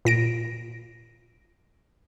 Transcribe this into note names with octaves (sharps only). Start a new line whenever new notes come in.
A#2 A#6 D7